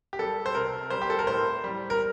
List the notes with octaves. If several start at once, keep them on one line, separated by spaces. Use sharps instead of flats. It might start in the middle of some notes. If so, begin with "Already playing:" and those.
G4
G3 A4
C5
C3 A#4
G3 C5
G4
A4
A#4
A2 C5
G3
A#4